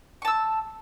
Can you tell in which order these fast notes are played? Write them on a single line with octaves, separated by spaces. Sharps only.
C#6 A5 E6